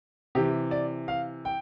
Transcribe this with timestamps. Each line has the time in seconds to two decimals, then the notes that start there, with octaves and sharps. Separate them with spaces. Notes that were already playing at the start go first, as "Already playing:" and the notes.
0.35 C3 E3 G4
0.71 D5
1.08 F5
1.45 G5